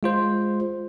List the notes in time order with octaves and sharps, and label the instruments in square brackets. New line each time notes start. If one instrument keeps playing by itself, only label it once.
[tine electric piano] G#3 F4 C5